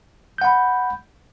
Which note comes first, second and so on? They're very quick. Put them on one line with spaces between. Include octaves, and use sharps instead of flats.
G6 F#5 B5